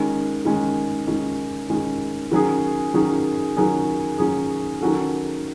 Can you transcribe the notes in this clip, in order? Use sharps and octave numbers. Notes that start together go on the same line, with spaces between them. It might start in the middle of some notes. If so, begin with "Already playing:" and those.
Already playing: D#3 G#3 C#4
D#3 G#3 C#4
D#3 G#3 C#4
D#3 G#3 C#4
D#3 F#3 C#4 G#4
D#3 F#3 C#4 G#4
D#3 F#3 C#4 G#4
D#3 F#3 C#4 G#4
D#3 F#3 C#4 F#4 A4